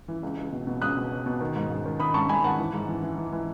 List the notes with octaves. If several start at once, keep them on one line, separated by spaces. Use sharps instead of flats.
E3
C#2
C#2
B2
B2
C#2 D#6 F#6
B2
B2
B2
D#3
G#2
G#2
D#3
D#3 B5 D#6
G#2 A5 C#6
G#2 G#5 B5
D#3 F#5 A5
E3
G#2
E3
E3
E3
E3